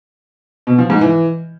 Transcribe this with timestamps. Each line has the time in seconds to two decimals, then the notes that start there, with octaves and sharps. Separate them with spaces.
0.67 B2
0.78 F3
0.90 G#2
1.01 E3